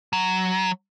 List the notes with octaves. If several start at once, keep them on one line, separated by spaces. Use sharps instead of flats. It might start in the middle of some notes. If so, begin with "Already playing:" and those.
F#3